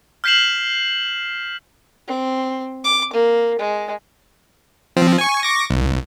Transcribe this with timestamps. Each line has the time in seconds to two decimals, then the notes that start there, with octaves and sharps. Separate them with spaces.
0.24 F6 G6 B6 C7 E7 F#7
2.08 C4
2.84 D6
3.13 A#3
3.59 G#3
4.97 F3 C4
5.18 G#5 C#6
5.43 C#6 D6 A#6
5.70 C2